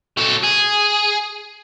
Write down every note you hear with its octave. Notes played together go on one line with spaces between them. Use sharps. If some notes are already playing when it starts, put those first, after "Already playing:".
F#3 A4
G#4